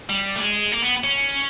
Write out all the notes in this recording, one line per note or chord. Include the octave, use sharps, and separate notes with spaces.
G3
A3
G#3
A#3
B3
C#4